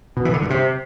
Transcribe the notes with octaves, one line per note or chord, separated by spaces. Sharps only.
B2
E3
D3
G2
C3